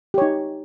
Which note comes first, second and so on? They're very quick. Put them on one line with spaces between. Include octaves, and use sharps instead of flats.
G4 C#5 D#4